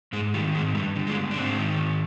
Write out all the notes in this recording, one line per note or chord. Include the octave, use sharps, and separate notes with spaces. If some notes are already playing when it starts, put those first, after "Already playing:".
G#2 G#3
D#3 G3
G#2 G#3
G2 G3
D3
G#3
G2
D4
G#2 C4
D#3
G#2